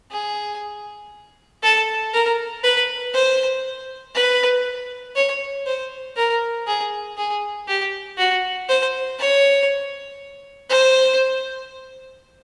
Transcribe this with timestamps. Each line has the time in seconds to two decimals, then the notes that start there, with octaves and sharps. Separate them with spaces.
0.11 G#4
1.63 A4
2.13 A#4
2.63 B4
3.14 C5
4.15 B4
5.16 C#5
5.66 C5
6.17 A#4
6.67 G#4
7.17 G#4
7.68 G4
8.18 F#4
8.69 C5
9.19 C#5
10.70 C5